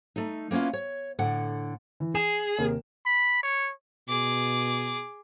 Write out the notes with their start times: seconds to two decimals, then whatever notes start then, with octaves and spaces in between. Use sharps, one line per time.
0.16 A3 D#4
0.51 A#3 B3 C#4 E4 F4
0.73 C#5
1.19 A2 D3 F#5
2.00 E3
2.15 G#4 E7
2.58 D#2 C3 A#4
3.06 B5
3.43 C#5
4.08 B2 G#4 D6